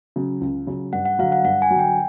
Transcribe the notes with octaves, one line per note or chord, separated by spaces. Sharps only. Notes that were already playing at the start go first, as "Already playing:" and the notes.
C#3 F#3
C#2
C#3 F#3
G2 F#5
F#5
D3 F#3 F5
F#5
G2 F#5
G#5
F#3
D3 G5